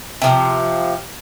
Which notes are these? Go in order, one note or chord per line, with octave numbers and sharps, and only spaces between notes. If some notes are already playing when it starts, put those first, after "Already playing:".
C3 F3